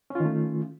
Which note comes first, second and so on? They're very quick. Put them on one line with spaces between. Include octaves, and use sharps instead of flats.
C#4 F4 D#3 A3